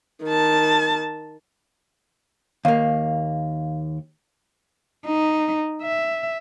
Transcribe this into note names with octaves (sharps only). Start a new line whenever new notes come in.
D#3 A5
D#2 A#3 F5
D#4
E5